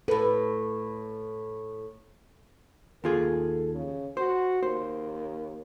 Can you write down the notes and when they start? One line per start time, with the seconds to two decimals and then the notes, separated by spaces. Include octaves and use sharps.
0.08 A2 A4 B4
3.04 D#2 F4 G#4 A4
3.75 C#3
4.17 F#4 C5
4.63 D#2 C5